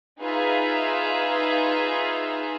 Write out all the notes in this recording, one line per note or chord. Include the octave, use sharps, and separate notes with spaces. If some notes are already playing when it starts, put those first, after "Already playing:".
D#4 F4 G#4 B4 E5 F5